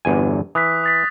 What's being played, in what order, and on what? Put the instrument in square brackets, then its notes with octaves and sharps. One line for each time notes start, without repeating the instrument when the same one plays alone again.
[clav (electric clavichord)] G1 E2 G#5
[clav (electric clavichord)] E3 [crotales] D#6 F#6 B6
[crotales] D#6 A6 B6